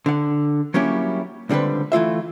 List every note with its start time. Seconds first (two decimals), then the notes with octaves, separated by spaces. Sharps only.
0.06 D3 F#5
0.74 F#3 G3 A#3 C#4 E4 G4
1.49 C#2 D3 G3 C4 B4
1.92 E3 A3 F4 E5